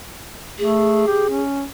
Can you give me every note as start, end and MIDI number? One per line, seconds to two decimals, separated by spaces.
0.59 1.03 57
0.59 1.41 68
1.07 1.26 67
1.29 1.65 61